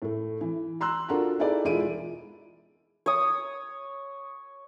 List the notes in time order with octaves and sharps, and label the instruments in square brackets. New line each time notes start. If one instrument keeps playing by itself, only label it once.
[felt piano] A2 A3
E3
A#5 C6 E6 F#6
D4 F4 F#4 A4 A#4 A#5
D#4 E4 G#4 A4 D5
E1 G#3 E4 F4 D7 D#7
[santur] C#5 D#6